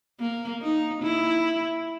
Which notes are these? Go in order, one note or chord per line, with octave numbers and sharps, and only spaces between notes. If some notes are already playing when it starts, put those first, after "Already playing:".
A#3
D#4
E4